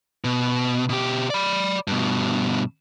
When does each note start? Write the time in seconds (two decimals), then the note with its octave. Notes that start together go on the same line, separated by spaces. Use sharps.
0.24 B2
0.89 B2 G4
1.30 D5 B5
1.88 G2 B2